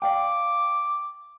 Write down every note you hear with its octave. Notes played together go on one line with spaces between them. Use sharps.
D5 F5 G5 D6